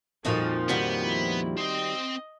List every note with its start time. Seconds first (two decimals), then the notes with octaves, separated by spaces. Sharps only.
0.25 F2 A#2 F3 D#4 F#4 A4 D#5
0.69 D#3 G3 B3 F#4
1.05 E4
1.58 C4 D#5 G5